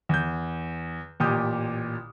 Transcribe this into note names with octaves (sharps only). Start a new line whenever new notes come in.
E2 G6
A1 A#2 G4 D#6 G6